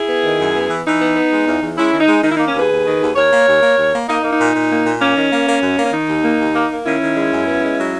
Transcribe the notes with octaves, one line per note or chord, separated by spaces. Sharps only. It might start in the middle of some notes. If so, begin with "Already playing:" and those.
Already playing: E4 G#4
B3
D#3
F#2
B3
E3
E3 D#4
B3
B3
G#3
E2
E2
G#3 C#4 E4
D#3
D#4
G#3
D#3 D#4
E4
A#3 D#4
C#4
D#2 G#4 B4
D#2
D#3
D#2
D#2 A#4 C#5
A#3
D#2
A#3
D#2
A#3
A#3 D#4
A#3
D#4
A#2
A#2
A#3
A#2
A#3 C#4
D#3
A#3
A#3
F#2
A#3
C#4
D#3 D#4
D#2
A#3
D#2
A#3
A#3
D#3 C#4 E4
D#3
G#3
F#2
B3
G#3
F#3